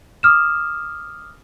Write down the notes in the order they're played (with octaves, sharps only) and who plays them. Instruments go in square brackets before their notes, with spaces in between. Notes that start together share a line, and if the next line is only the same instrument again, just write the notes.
[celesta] D6 D#6 F6 E7